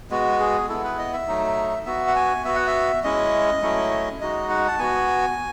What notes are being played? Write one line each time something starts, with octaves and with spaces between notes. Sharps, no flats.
G#3 B3 F#4
G#4
B3 E4 A4
B4
D#5
E5
F#3 A3 D#4
B3 F#4 E5
F#5
G#5
B3 F#4 E5
F#5
E5
G#3 C#4 E4 D#5
F#3 A3 C#4 E4
G#3 D#4 F#4 D#5
F#5
A5
B3 F#4 G#5